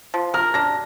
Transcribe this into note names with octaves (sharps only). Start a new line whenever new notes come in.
F3
A#4 F6
D4 A#6